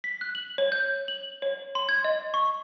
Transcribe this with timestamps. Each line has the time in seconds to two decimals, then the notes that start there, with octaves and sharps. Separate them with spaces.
0.04 B6
0.21 F#6
0.35 F#7
0.58 C#5
0.72 G6
1.08 F#7
1.42 C#5
1.75 C6
1.89 G#6
2.04 D#5
2.34 C#6